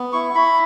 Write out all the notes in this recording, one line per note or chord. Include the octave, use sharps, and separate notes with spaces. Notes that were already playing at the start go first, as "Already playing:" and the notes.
Already playing: B3
E4 C#6
E4 B5